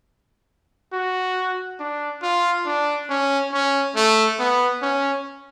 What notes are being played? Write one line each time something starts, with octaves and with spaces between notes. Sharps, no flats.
F#4
D4
F4
D4
C#4
C#4
A3
B3
C#4